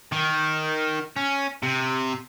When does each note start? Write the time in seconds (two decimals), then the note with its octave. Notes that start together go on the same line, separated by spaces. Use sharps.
0.12 D#3
1.17 C#4
1.63 C3